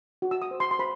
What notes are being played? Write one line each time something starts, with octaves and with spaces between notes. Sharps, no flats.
F#4
E6
D#6
C5
C6
C6
C5 B5